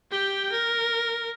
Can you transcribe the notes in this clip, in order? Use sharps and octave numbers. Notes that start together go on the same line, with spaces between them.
G4 G5
A#4